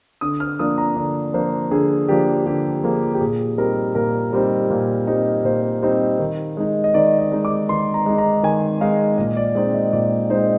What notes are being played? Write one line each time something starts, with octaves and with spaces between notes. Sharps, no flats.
D3 D#6
F6
F3 A#3 D4 D#6
A#5
D3 D5
F3 A#3 D4 C5
D3 G#4
F3 A#3 D4 G4
D3 G4
F3 A#3 D4 G#4
G4
A#2 G#4
G3 C4 D#4 A#4
A#2 A#4
G3 C4 D#4
A#2
G3 C4 D#4
A#2 C5
G3 C4 D#4
D#3
G#3 D#4
D#5
D#3 D5
D#5
G#3 D#4
D6
D#3 C6
A#5
G#3 D#4
A#5
D#3 G#5
G#3 D#4 F5
A#2 D#5
D5
G#3 C4 D#4 D5
D#5
A#2 D5
G#3 C4 D#4 C5